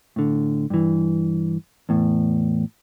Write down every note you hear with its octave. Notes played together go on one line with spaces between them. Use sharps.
A2 D3
G2 E3
E2 A2